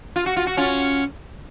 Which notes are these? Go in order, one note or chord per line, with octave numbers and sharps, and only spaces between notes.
F4
F#4
F4
F#4
C#4 F4